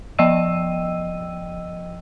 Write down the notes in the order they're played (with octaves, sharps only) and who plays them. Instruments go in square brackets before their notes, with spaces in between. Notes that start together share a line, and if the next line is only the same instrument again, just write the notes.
[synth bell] F3 D#5 G5 E6 D#7